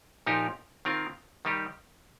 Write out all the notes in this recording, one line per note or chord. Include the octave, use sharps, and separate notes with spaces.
A#2 F3 D#4 G4 A#4
D#3 C4 F4 A#4
D#3 G3 D#4 G4